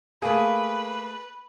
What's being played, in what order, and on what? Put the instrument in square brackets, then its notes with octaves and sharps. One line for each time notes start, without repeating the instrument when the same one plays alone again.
[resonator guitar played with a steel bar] A3 G#4 [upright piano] A#3 [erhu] B4